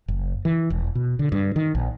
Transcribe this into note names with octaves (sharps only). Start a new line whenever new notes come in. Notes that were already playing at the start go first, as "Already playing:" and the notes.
F#1
E3
E1
B2
D3
G2
D#3
A#1